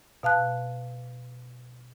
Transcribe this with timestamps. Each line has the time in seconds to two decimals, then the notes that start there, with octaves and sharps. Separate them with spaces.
0.23 B2 F5 A5 F#6